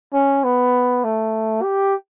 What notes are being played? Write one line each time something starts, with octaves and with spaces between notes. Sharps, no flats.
C#4
B3
A3
G4